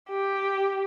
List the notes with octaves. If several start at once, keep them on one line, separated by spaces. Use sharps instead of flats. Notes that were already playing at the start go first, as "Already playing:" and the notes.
G4